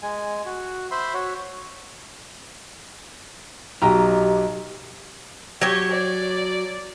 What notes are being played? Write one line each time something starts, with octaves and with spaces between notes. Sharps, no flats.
G#3 G#5
F#4
C5 E5 B5 C6
F#4 C#5
B1 G4 D#5 G5 A#5
F#3 G4 C#5
D5